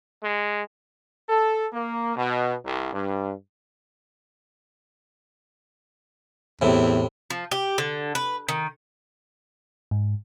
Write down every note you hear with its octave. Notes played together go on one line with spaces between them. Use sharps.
G#3
A4
A#3
B2
C2
G2
E2 A2 C3
F3
G4
D3
B4
D#3
G#2